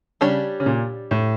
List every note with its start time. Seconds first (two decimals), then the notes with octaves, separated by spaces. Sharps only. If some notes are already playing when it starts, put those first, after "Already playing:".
0.21 C#3 G3 D4 G4 C#5
0.60 C#3
0.66 A#2
1.11 A2